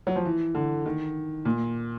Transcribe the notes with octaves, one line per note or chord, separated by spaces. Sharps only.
F#3
F3
E3
D3
D#3
A#2